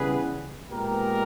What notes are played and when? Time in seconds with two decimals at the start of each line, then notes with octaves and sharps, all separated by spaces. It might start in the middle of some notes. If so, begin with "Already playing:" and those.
Already playing: C#3 E3 G3 B3 G#4 B4
0.69 A#2 G#3 B3 G4 A#4